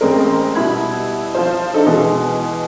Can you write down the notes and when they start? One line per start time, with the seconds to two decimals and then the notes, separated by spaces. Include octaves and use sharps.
0.01 A1 G#3 C4 A#4
0.55 B2 G3 E4 B5 G#6
1.35 F3 F4 C5
1.74 D4 D#4 A4
1.87 B2 E3 G#3